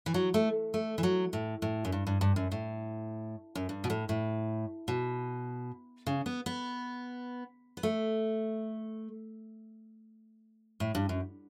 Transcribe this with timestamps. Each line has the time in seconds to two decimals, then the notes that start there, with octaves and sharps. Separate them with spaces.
0.06 E3
0.14 F#3
0.34 A3
0.74 A3
0.98 E3
1.03 F#3
1.33 A2
1.62 A2
1.85 F#2
1.92 G2
2.07 G2
2.21 G2
2.36 F#2
2.51 A2
3.55 F#2
3.69 G2
3.84 B2
3.90 A2
4.09 A2
4.88 B2
6.06 C#3
6.26 B3
6.46 B3
7.77 B3
7.83 A3
10.80 A2
10.95 G2
11.09 F#2